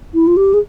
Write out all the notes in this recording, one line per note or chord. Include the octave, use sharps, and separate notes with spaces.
E4
F4
G4
G#4